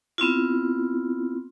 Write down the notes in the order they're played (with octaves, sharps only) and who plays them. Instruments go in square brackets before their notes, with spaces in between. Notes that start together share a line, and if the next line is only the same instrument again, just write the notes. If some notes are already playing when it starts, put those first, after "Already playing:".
[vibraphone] B3 C4 E4 F4